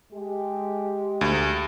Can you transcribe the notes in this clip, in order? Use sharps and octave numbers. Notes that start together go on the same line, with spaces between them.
G#3 G4
D2